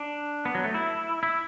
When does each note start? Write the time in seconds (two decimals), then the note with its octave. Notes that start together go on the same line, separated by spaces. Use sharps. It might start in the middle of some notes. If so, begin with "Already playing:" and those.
Already playing: D4
0.45 B3
0.55 F#3
0.64 A3
0.74 E4
1.23 E4